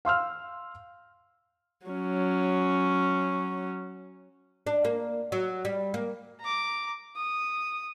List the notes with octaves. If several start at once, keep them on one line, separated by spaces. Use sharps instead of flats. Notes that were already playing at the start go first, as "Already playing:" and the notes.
F5 C6 E6 F6
F#3 C#4
D4
A#3
F#3
G3
A#3
A#5 D6
D#6